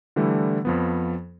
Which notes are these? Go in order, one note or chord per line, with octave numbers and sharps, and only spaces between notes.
D3 E3 G3 A3 D4 E4
F2 F3 B3